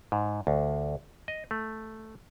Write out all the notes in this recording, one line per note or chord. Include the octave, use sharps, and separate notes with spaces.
G#2
D2
D#5
A3